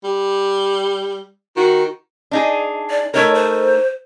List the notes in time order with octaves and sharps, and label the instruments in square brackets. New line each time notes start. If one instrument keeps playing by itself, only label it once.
[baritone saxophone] G3
[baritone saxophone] D#3 [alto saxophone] F#4
[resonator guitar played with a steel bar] D4 D#4 G#4
[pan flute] D5
[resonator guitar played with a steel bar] A3 D#4 A#4 [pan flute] C#5
[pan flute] C5